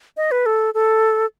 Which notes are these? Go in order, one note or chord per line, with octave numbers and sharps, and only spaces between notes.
D#5
B4
A4
A4